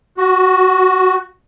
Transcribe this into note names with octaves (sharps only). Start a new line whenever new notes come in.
F#4